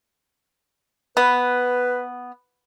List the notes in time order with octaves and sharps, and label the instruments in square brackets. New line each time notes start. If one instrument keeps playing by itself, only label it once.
[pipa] B3 [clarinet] B4